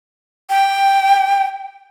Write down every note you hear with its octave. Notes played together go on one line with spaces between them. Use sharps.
G5